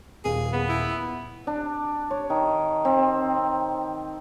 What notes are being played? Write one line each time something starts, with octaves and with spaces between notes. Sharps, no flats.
D#1 G#4 F5
B3
E4
D4
C#5
D#3
C4